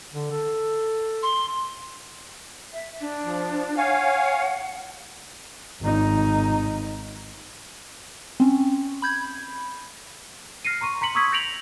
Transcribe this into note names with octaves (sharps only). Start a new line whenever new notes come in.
D3
A4
C6
E5
D4
F3
C#5 F5 F#5 G#5
G#1 D#4
C4 C#4
B5 G6 G#6
F6 A#6 C7 C#7 D#7
A#5 C6 C#6 D#7
A#5 C6 B6 C#7 F#7
C#6 D#6 E6 G#6 B6
G6 A#6 C#7 D7 F7 F#7